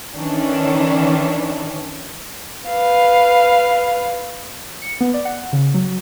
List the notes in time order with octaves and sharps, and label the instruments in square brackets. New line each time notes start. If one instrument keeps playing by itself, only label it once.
[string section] D#3 E3 C#4 D4
[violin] B4 F5
[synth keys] C#7
B3
D5
F#5
C#3
F#3